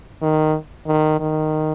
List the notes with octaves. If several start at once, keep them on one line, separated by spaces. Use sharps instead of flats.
D#3
D#3
D#3